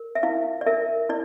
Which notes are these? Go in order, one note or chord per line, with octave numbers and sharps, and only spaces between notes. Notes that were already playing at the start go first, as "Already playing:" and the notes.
Already playing: A#4
E5
E4 F5
D5
A#4 E5
E4 D5